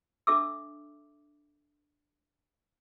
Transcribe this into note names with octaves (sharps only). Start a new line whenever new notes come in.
D4 A4 E5 D6 E6